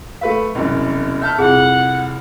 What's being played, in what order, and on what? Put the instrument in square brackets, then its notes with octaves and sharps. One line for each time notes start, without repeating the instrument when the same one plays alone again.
[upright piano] A3 B4 E5 [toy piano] F5
[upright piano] E1 C2 F#2
[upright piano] E5 A5 F6 [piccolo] G6
[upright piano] C2 F2 [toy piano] G#4 [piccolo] F#5